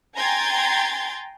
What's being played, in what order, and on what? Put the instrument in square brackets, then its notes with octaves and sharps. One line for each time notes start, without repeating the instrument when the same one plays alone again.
[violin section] G5 G#5 A#5 C6 G#6 A6